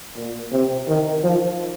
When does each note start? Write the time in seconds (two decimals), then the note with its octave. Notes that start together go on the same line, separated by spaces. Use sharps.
0.16 A#2
0.52 C3
0.88 D#3
1.24 F3